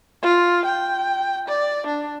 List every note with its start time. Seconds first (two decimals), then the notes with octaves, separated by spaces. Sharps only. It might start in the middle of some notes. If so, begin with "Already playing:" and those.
0.22 F4
0.65 G5
1.48 D5
1.87 D4